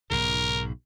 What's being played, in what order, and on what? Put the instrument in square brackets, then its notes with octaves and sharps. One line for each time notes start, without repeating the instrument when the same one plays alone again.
[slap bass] B1 G#2 C#3 [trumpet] A#4